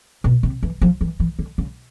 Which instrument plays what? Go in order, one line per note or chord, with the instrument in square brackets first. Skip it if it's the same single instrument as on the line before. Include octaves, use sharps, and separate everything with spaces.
[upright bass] B2
C3
E3
F3
E3
E3
D3
C#3